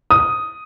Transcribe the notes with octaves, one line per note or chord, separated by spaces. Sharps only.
D#6